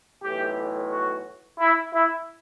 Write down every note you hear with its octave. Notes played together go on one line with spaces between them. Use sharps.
B1 A2 E3 G4
F#4
E4
E4